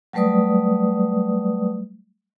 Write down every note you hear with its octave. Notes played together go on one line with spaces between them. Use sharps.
F#3 G3 A3 B4 D5 D#6